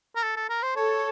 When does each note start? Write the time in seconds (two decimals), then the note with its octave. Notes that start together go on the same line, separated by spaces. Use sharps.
0.16 A#4
0.23 A4
0.36 A4
0.49 A#4
0.62 C5
0.76 A4 C#5